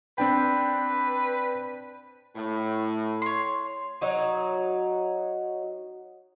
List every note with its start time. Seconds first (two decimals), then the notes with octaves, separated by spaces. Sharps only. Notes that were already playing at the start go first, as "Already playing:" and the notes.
0.18 C4 D4 B4 G5
2.35 A2
3.22 C#5 C6
4.01 F#3 D#4 F#4